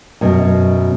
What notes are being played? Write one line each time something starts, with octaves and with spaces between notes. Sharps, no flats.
F#2 B2